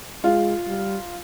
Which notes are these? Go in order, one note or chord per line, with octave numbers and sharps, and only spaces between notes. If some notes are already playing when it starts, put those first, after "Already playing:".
G#3 F4
G3